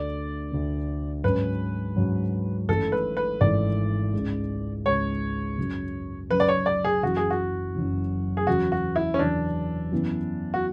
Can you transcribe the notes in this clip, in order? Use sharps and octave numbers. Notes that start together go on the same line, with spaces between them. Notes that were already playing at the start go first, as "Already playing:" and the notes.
Already playing: D2 D3 A3 D5
D2 D3 A3
G#2 F#3 C#4 B4
G#2 F#3 C#4
G#1 G#2 E3 A3 C#4 A4
B4
B4
G#1 G#2 E3 A3 C#4 D5
C#2 C#3 G#3
C#2 C#3 G#3 C#5
F#2 C#3 F#3
F#2 C#3 F#3 B4
D5
C#5
D5
G#4
F#1 F#2 E3 F#4
G#4
F#4
F#1 F#2 E3
G#4
E2 C#3 F#3 F#4
F#4
E4
C#4
E2 C#3 F#3 D4
F#2 E3 B3 E4
F#4